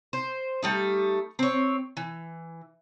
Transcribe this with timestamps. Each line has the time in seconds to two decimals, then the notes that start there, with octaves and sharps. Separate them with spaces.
0.13 C5
0.63 G3 A3 D#4
1.39 C4 C#5
1.97 E3